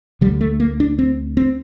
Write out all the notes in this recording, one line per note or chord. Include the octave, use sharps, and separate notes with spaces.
D2 D3 G3
A3
A#3
D4
C4
C4